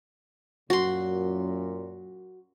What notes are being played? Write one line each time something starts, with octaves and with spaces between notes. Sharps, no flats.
F#2 A#2 F#4 C6